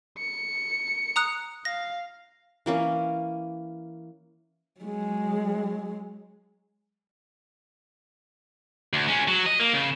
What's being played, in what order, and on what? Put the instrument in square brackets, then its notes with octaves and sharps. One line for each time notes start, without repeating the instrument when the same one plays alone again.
[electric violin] C#7
[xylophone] A#5 D#6 F#6
[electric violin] F5 [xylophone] A#6
[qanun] E3 A#3 C#4
[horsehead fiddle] F#3 G#3
[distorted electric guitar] D2
G#3 C#4
F#3
D#5
A#3
C#3